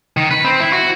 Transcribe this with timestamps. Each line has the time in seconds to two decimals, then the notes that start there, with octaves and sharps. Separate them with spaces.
0.17 D#3
0.31 B4
0.44 C4
0.60 E4
0.73 F#4